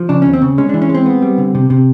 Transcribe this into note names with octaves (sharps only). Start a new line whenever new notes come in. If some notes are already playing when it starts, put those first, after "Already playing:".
Already playing: F3
C#3 D4
C#4
D#2
C4
C#3
G#3 C#4
D4
E3
C#4
G#3
C4
B3
G3
D3
C3
C3